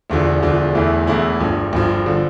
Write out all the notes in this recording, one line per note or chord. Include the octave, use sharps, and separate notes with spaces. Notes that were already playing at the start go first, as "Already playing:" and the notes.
E1 E2 D3 F3
E1 E2 D3 F3
E1 E2 E3 A3 E4
E1 E2 E3 A3 E4
G1 G2 F3
G1 G2 F3
D3 F3